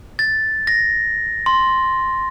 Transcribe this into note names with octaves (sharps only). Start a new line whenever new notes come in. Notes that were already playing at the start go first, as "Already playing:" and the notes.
A6
A#6
C6